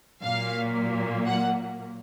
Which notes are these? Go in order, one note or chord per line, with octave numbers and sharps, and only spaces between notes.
A#2 F#3 A#3 F5
F#5